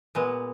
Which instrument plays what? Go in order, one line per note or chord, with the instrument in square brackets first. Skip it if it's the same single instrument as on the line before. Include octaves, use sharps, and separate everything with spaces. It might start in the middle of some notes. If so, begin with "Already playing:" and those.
[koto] A#2 G#3 B3